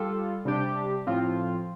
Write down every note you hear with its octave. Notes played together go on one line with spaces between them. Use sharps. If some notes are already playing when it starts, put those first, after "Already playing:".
Already playing: G3 F4 A4
C3 G3 D4 G4
A2 F3 C4 F4